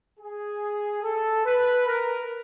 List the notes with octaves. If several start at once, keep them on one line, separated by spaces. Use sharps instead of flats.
G#4
A4
B4
A#4